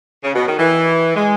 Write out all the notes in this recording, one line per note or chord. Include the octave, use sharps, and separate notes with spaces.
C#3
B2
D#3
E3
G#3